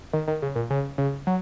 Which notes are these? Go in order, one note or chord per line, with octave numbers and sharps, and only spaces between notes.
D#3
D#3
C#3
A#2
C#3
C#3
F#3